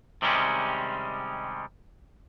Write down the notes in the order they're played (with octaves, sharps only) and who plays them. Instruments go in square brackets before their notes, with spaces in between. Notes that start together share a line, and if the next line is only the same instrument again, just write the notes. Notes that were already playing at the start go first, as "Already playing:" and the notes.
[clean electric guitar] C3 D#3 G3 G#3 C#4